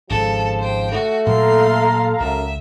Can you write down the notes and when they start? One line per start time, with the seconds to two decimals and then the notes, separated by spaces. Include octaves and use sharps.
0.10 G#1 C#3 F3 A4
0.60 C5 G5
0.92 A3 F#4
1.26 A#2 F#3 A#3 A4 F5 A#5 C6
2.20 C#2 F#2 E5